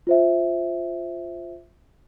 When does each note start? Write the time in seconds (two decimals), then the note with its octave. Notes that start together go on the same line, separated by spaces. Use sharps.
0.07 F4 C5 E5